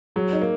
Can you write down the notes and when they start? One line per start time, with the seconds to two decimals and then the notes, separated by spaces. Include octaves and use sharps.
0.16 F#3 G#4
0.33 D#4
0.41 A#3